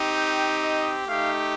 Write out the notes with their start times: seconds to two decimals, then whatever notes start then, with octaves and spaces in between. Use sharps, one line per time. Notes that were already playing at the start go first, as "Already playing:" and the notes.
Already playing: C4 D#4 G4
0.17 G5
0.62 D#5
1.07 A3 D#4 G4 F5